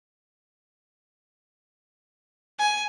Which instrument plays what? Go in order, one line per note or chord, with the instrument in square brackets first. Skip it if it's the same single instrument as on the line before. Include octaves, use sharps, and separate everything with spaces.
[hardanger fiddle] G#5